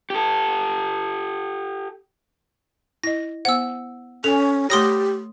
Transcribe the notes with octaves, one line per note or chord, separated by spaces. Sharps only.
G4 A4
E4 D#5 A#6
B3 C5 F#5 E6
C#4 A4 G#5 F7
A3 G4 C#5 C6 D#6 A#6